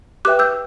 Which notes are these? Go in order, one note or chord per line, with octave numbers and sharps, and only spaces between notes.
G4 B4 E5 G5 D6 F#6
E6 G6